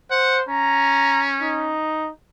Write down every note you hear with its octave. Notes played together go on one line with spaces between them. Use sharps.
C5 F#5
C#4 A#5
D#4